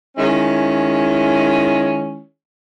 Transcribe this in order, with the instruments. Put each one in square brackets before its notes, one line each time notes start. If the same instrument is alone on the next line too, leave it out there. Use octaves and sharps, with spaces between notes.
[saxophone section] D#3 G#3 C#4 E4